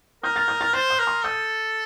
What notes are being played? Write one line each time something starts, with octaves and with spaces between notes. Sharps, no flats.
A#4 D#6 G6
F6 A6
D#6 G6
F6 A6
C5 F6 A6
D#6 G6
A#4
C6 D#6
A4 D#6 G6